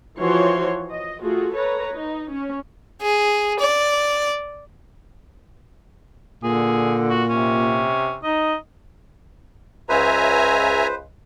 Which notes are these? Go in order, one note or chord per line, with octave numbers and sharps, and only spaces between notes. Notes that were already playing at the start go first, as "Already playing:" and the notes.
E3 F3 F#4 C5 C#5 C6
D#5
A3 F4 F#4 G#4
A4 B4 C#5 A#5
D#4
C#4
G#4
D5
A#2 D3 G#4
F#4
C3 C#4
D#4 D#5
C#2 B4 C5 E5 G#5 A#5